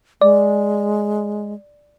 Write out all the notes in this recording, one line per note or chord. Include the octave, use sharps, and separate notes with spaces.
G#3 D5